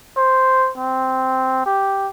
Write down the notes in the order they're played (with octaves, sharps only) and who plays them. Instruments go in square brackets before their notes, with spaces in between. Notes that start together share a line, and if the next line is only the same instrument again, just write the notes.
[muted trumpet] C5
C4
G4